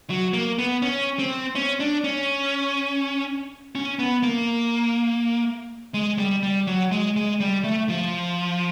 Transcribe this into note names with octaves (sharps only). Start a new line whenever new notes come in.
F#3
A#3
B3
C#4
C4
C#4
D4
C#4
C#4
B3
A#3
G#3
G3
G3
F#3
G#3
G#3
G3
A3
F3